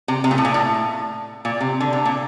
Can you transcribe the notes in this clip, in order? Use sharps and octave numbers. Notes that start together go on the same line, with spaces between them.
C3
C3
A#2
A2
A#2
A2
A#2
C3
D3
C3
A#2